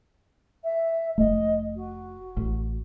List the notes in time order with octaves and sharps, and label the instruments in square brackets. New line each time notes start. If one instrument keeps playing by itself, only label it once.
[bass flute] E5
[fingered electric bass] F1 A3 [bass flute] D#5
[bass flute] F#4
[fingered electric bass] A1